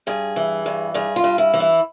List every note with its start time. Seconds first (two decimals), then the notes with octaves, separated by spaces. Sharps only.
0.07 G2 G#4
0.36 E3
0.66 G2
0.94 G2 G#4
1.16 F4
1.24 G2
1.38 E4
1.54 E3
1.60 E4